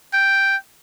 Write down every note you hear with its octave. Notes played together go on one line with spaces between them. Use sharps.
G5